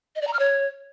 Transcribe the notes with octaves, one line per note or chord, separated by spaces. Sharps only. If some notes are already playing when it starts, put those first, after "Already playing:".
D#5
D5
A#5
F6
C#5